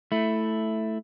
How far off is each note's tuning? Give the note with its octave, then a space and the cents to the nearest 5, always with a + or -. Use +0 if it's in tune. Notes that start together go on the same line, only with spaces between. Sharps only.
A3 +0 E4 +0